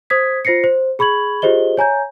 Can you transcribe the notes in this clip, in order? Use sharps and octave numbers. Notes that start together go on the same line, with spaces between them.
C5 D#6 G#6 B6
F4 C5 A#6 C7 C#7
C5
G#4 B5 C#6 G#6 F#7
F4 G4 G#4 C5 D#5 G7
C#5 G#5 A#5 G6